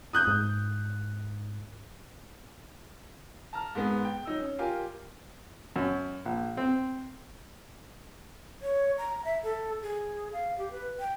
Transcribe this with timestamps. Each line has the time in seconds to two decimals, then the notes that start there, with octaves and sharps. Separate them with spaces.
0.13 D#6 F#6 G6
0.27 G#2
3.53 A5 A#5 F6
3.75 G#2 G#3 B3
4.05 G5
4.25 F#3 D#4 E6
4.40 C#4
4.59 F4 G4 A#4 F5 G#5
5.76 F#2
6.25 A#1
6.57 C4
8.62 C#5
8.98 A#5
9.25 E5
9.44 A4
9.82 G#4
10.33 F5
10.58 G4
10.71 B4
11.00 G5